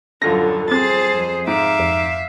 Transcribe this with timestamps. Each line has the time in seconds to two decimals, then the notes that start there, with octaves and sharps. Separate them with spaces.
0.22 D#1 F#2 D3 F4 A#6
0.71 C4 G#4 C5 A6
1.14 F2
1.47 G#2 E5 F5 D6
1.79 F2